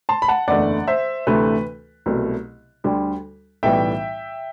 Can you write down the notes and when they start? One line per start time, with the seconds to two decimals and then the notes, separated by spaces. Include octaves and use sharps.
0.09 A5 C6
0.22 B5
0.28 F#5 A5
0.48 F#1 E2 D3 A3 D5 F#5
0.88 C5 E5
1.27 D2 C3 E3 A3 B4
2.06 C2 B2 F#3 A3
2.84 D2 D3 G3
3.63 B1 A2 E3 G3 E5 G5